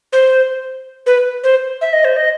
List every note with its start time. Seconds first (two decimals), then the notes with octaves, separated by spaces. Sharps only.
0.13 C5
1.06 B4
1.44 C5
1.81 E5
1.93 D#5
2.05 C5
2.17 D#5